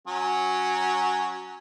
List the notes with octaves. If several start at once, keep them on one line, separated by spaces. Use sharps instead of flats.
F#3 C#4